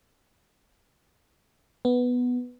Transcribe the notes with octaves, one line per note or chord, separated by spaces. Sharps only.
B3